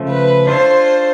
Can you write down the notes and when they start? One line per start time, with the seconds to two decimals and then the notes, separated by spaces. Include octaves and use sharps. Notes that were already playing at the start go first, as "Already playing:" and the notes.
Already playing: C#3 F3 A3
0.09 B4
0.47 D4 F4 A4 C5 C#5